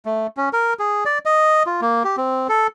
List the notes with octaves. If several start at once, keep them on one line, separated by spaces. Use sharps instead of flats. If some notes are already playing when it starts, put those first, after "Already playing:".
A3
C#4
A#4
G#4
D5
D#5
F4
A#3
G4
C4
A4